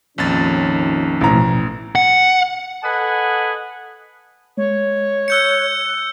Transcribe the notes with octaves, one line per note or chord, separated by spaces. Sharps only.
A#1 F2 D#3 C#4 A6
A1 B2 F3 A3 A#5
F#5
A4 B4 D#5 F#5 G#5
G#3 C#5
E6 F#6 G6 C#7